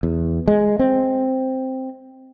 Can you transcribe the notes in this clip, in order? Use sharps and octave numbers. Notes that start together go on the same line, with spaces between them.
E2
G#3
C4